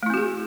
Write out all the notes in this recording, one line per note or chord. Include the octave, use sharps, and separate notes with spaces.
A3 C4 E4 F#4 G#4